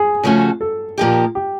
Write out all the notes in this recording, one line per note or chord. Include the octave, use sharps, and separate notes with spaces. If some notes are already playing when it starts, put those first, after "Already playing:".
Already playing: G#4
C#3 F3 A3 C#4 F#4
A4
A#2 F3 A#3 D#4 G4
G4